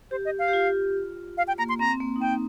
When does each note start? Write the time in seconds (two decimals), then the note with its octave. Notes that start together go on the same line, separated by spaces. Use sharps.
0.11 G4 C5
0.25 D#5
0.39 F5
0.48 G4
0.53 F4
1.38 F5
1.48 G5
1.58 A#3 A#5
1.69 C6
1.79 C4 A#5
1.91 C4
2.00 A#3
2.16 D#4
2.21 C4 G5